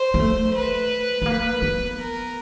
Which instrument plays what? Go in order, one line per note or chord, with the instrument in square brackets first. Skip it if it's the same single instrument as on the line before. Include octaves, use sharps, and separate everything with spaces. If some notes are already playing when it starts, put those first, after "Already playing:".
Already playing: [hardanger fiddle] C5
[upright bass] A#3
A3
[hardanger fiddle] B4
[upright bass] A3
A#3
B3
[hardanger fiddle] A#4